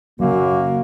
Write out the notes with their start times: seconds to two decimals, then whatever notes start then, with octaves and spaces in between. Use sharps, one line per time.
0.20 F#2 C#3 F#3 A#3 F#4